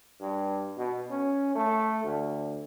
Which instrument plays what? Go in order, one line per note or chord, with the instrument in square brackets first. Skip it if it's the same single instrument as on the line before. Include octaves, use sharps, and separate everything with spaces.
[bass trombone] G2
B2
C#4
A3
D2